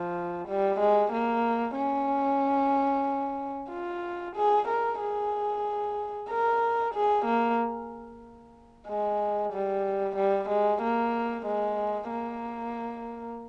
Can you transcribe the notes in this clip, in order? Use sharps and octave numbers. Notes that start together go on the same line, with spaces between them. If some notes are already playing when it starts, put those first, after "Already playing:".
Already playing: F3
G3
G#3
A#3
C#4
F4
G#4
A#4
G#4
A#4
G#4
A#3
G#3
G3
G3
G#3
A#3
G#3
A#3